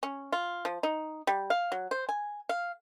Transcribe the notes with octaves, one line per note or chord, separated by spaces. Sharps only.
C#4
F4
F3
D#4
G3
F5
F#3
C5
G#5
F5